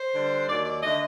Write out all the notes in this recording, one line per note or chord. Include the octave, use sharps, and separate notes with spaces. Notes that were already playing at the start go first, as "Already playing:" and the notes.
Already playing: C5
D3 G3 D4
D#2 D#3 F#3 D5
D5
D3 A3 D4 D#5